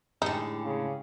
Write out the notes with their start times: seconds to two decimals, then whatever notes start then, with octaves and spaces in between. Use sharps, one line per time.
0.22 A2 D3 G#3 D#4 G4 G#4
0.64 C#3